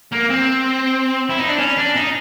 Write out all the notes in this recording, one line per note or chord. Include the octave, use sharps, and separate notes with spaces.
A#3
C4
E4
D#4
D4
C#4
D4
D#4